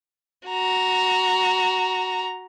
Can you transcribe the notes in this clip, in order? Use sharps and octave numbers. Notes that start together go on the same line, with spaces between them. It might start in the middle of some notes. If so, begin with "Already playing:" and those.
F#4 A#5